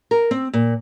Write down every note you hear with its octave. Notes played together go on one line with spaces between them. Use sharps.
A#4
C4
A#2